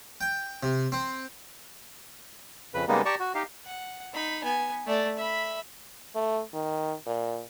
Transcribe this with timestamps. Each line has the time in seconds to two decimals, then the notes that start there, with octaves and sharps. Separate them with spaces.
0.21 G5
0.63 C3
0.92 C4
2.74 F2 C#3 B4
2.88 C#3 G3 G#3 A#3 B3 D#4
3.05 G4 D5 A5 A#5 C#6
3.20 F#4
3.35 D#4 G4 F5
3.65 F#5
4.13 D#4 B5
4.44 B3 G#5
4.87 A3 D5
5.17 E5 B5
6.15 A3
6.54 D#3
7.06 A#2